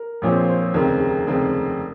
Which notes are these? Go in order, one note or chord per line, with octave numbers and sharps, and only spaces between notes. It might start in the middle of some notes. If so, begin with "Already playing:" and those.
Already playing: A#4
A#1 A#2 F3 C4 C#5
C5
C5
C5
F1 D#2 C#3 G#3 C4 A#4
G#4
F1 D#2 C#3 G#3 C4